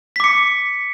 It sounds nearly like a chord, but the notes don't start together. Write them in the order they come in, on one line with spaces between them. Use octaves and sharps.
B6 D6 C#7